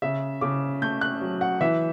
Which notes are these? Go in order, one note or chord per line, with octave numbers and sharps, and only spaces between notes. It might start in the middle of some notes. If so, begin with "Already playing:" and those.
C#3 E5
C#3 D6
A3 G6
F#6
F#3
F#5
E3 E5